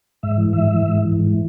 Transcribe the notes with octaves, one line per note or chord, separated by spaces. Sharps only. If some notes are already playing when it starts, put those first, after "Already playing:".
G#2 E5
E3
G#2 E5
E3
G#2
E3
G#2
E3